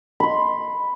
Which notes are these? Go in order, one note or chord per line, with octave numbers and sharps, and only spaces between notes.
B5 C6